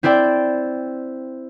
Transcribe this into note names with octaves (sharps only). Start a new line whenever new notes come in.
C4 E4 C5 D5 G5